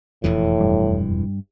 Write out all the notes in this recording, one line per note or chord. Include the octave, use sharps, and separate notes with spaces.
E1 F2 A2 E3
G2